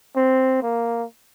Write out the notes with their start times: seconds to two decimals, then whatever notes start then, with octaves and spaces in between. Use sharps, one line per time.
0.16 C4
0.62 A#3